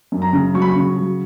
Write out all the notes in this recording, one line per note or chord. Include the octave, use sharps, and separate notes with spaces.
F#2
A#5
C#3
F#3 C#6
B5
C#6
C#3
F#3